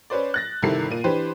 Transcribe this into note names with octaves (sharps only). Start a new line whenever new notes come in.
C#4 B4 C5 D5
F#6 A6 A#6
G1 C3 D#3 E4 A4 C7
A#2 D#7
E3 D4 G4 B4 C5